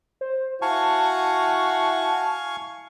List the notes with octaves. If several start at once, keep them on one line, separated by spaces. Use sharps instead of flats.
C5
E4 F#4 F5 G#5 A5 C#6